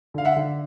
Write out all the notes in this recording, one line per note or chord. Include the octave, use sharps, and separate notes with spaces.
D3 F5
E5 F#5
D3